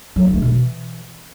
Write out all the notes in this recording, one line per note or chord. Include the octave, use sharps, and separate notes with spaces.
F#3
A#3
A3
B2
E3